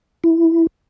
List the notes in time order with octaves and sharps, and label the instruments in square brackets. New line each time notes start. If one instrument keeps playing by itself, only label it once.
[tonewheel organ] E4